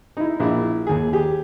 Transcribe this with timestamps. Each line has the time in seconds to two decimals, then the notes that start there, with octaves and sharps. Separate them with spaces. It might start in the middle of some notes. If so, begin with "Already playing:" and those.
0.17 D#4 E4
0.40 A#1 E4
0.87 D#2 G#4
1.13 G4 G#4